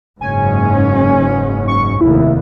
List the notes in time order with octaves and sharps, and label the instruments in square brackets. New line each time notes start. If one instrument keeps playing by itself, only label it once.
[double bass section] F#1 G#2 C#4 [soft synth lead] G#5
[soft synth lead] C#6
[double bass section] F1 D#2 [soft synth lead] E4